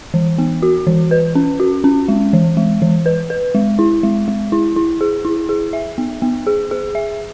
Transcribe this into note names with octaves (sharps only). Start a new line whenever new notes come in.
E3
B3
F#4
E3
B4
C#4
F#4
C#4
G#3
E3
G#3
E3
B4
B4
G#3
E4
G#3
G#3
E4
E4
G#4
E4
G#4
E5
B3
B3
G#4
G#4
E5